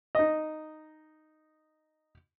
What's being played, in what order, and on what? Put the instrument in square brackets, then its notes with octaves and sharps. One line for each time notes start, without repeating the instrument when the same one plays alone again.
[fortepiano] D#4 D#5